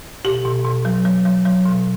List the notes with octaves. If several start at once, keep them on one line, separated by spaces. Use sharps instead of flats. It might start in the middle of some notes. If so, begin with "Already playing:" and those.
B2 G4
B2
B2
F#3
F#3
F#3
F#3
B2